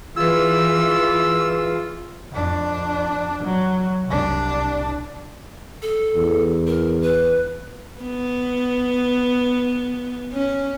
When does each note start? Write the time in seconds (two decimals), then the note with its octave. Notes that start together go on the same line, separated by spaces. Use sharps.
0.17 E3 F4 G#4 B4 E6
2.32 F2 D4
3.43 F#3
4.07 C2 D4
5.82 A4
6.15 E2
6.67 A#4
7.02 B4
8.00 B3
10.33 C#4